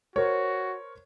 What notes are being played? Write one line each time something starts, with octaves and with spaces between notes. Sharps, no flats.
F#4 A#4 C5 C#5